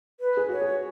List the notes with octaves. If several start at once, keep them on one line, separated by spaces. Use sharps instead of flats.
B4
G#4
F#4 C#5
G#4